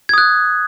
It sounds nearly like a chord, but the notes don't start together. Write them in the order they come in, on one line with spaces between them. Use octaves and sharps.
G#6 D#6 F#6